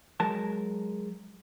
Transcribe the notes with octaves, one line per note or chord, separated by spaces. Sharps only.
F#3 G#3 A#4 A5